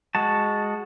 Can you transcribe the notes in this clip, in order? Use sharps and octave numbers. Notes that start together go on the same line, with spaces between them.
G#3 F#4 A5